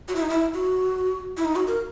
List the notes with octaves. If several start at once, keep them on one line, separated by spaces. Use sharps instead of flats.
F#4
E4
D#4
E4
F#4
E4
D#4
F#4
A#4